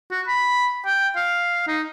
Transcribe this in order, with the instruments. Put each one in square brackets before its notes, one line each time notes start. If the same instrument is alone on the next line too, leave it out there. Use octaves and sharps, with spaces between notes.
[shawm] F#4
B5
G5
F5
D#4